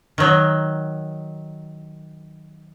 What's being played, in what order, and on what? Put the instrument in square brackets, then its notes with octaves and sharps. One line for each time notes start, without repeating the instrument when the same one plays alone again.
[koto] D#3 F#3